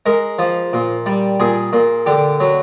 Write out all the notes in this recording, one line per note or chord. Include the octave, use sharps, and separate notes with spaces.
G#3 A#4
F3
A#2
G3
A#2 G#4
A#2
D3 G4
F#3